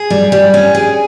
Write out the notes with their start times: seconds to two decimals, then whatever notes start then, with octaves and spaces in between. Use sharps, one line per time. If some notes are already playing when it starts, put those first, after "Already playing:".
Already playing: G#4
0.10 G3
0.32 G3
0.54 C#4
0.75 G#4